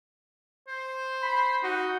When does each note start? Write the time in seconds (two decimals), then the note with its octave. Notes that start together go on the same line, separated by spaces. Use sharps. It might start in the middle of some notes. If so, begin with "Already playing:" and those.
0.68 C5
1.22 B5
1.63 D#4 F#4